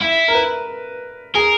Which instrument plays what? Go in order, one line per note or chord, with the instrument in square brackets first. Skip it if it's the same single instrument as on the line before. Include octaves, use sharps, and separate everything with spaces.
[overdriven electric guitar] E4 [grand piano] E5
[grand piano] A#4
B4
[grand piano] G#4 [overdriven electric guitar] A#4